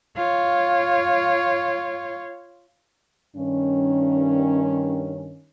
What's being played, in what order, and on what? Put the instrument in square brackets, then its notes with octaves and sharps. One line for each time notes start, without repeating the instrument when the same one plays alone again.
[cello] F4 C#5
[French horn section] G2 D#3 C#4